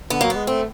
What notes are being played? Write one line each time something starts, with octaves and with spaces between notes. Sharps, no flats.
D3 B3
F#3 A#3
B3
G#3
A3 C4